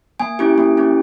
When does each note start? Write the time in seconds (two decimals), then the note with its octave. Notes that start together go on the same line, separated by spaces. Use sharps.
0.20 A#3 G#5
0.39 C#4 E4 G4
0.58 A#3
0.77 C#4 E4 G4